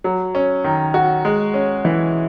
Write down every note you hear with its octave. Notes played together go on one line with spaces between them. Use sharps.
F#3
C#4
D#3
F#4
G#3
C#4
E3